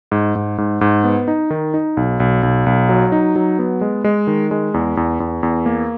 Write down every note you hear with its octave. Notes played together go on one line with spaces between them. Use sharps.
G#2
G#2
G#2
G#2
B3
D#4
D#3
D#4
B1
B1
B1
B1
F#3
D#4
F#3
B3
G#3
G#3
D#3
G#3
E2
E2
E2
E2
A#3